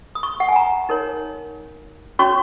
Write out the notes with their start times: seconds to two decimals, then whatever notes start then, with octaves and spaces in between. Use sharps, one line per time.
0.15 D#6
0.23 C#6
0.40 F#5
0.49 G#5
0.56 A#5
0.89 D#4 A#4 C#5
2.19 C#4 F#4 C#5 C#6